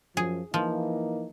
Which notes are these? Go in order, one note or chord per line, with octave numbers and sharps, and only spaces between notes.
F#2 F3 G#4
E3 F3 A#3 D#4